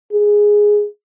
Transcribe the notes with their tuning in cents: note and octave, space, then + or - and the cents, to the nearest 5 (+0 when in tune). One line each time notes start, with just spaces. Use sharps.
G#4 +0